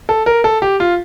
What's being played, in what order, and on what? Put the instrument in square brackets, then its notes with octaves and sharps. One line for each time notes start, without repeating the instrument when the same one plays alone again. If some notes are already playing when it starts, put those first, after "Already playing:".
[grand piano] A4
A#4
A4
G4
F4